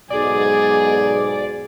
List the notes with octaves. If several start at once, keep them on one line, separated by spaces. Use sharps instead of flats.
B1 G#2 B2 G#4 D5